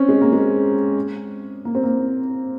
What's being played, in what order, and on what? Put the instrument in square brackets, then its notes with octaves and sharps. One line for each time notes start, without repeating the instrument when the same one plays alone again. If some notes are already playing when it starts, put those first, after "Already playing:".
Already playing: [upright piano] C4 C#4
G#3
A#3
G#3
A#3
C4
A#3